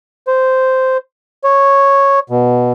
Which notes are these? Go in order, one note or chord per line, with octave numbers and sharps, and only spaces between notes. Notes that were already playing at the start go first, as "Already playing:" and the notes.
C5
C#5
B2